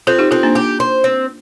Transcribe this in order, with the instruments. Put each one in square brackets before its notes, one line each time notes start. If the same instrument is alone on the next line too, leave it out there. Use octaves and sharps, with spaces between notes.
[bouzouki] C4 [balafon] F4 A4
[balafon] D#4 G4
[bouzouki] C4 [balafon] F4 A4
[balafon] A#3 D4
[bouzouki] G4
C5
C4